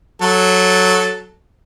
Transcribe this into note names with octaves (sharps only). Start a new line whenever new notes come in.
F#3 A4